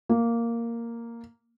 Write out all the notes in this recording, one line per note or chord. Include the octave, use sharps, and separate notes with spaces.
A#3